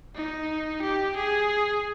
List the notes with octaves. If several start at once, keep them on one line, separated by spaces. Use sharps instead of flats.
D#4
G4
G#4